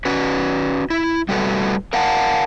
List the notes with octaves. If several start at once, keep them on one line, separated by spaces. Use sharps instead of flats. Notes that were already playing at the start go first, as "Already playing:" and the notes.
C#4 F#4 B4
E4
G3 A3 F#4 A4 B4
A#4 F5 F#5 A5